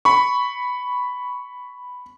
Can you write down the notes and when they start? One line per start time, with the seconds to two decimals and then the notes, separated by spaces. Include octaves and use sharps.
0.05 B5 C#6